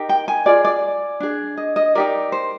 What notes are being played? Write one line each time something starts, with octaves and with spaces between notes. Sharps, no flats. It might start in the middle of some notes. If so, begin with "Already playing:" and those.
Already playing: D#4 G4 A#4
G5
G#5
F4 G#4 D5
D5
D4 G#4
D#5
D#5
D#4 G4 A#4 D5
C5